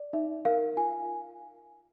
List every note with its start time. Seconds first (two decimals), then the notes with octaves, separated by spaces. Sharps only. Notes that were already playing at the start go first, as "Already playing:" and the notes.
Already playing: D5
0.13 D#4 E5
0.45 A#4 F5
0.77 F4 G#5